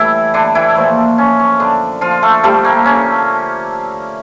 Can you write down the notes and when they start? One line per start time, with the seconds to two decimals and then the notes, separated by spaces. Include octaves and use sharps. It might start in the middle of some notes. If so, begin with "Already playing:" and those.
Already playing: A2 E3 G3 E4 A4
0.34 D3 D4
0.55 E3 E4
0.76 A#2 F3 A3
1.18 C#4
1.39 C#4
1.60 D3 D4
2.01 F3 F4
2.22 A3 A4
2.43 D3 F3 G3 A3 G4
2.64 A#3
2.85 C#4